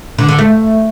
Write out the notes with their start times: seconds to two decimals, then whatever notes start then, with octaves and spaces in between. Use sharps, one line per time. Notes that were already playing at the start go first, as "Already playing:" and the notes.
0.18 D3
0.28 D3
0.39 A3